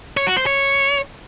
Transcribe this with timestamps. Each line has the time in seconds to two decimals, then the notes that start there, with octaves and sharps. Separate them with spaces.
0.17 C#5
0.27 F#4
0.37 C5
0.46 C#5